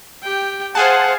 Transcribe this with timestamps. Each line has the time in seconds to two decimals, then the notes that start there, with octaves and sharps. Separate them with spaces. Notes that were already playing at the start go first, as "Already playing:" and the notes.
0.23 G4 G5
0.75 G#4 C5 F5 F#5 G#5 A5